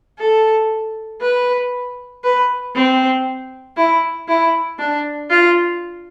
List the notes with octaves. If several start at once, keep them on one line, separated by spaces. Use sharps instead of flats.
A4
B4
B4
C4
E4
E4
D4
F4